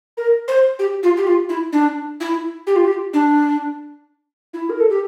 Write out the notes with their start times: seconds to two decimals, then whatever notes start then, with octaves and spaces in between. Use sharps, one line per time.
0.17 A#4
0.48 C5
0.79 G4
1.03 F4
1.17 G4
1.27 F4
1.49 E4
1.73 D4
2.20 E4
2.67 G4
2.76 F4
2.84 G4
3.13 D4
4.54 E4
4.70 A#4
4.80 A4
4.90 G4